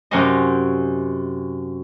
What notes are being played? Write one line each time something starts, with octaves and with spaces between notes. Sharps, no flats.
F#2 C3 C#4 C5 D#5